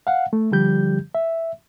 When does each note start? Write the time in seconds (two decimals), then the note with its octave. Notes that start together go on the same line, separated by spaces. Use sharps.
0.07 F5 F#5
0.33 A3
0.51 D3 F3 G3 G4 G6
1.15 E5